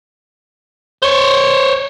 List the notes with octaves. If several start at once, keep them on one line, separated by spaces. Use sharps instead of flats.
C5 C#5